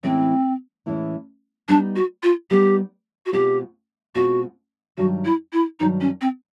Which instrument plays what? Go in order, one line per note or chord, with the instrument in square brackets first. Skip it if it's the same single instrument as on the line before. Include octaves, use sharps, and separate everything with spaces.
[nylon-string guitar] A2 E3 G#3 C#4 [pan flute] C4
[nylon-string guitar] A2 E3 G#3 C#4
[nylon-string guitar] G3 B3 D#4 [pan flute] D4
[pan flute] F#4
F4
[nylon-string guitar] G3 B3 D#4 [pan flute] G4
[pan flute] F#4
[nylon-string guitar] B2 G#3 C4 F4 [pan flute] G4
[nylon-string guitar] B2 G#3 C4 F4 [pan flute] F#4
[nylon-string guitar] G2 D#3 F#3 [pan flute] F#4
[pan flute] E4
E4
[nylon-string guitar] G2 D#3 F#3 [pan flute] D#4
[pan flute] C#4
C4